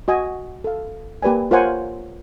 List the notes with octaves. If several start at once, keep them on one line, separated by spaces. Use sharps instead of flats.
F#4 D#5 G#5
A4 F5
A#3 G4 B4 D5 G#5
F4 A#4 C5 C#5 F#5 G#5